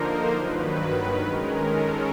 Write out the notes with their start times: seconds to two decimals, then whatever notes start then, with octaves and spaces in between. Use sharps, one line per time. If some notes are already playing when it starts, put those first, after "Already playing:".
Already playing: D3 F3 A#3 D#4 A#4 C5
0.32 G2 D#3 F#3 B4
1.18 D#3 G#3 C#4 A#4
1.62 A4